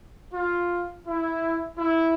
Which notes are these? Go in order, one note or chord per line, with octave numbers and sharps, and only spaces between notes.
F4
E4
E4